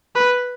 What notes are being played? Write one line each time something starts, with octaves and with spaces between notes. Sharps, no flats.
B4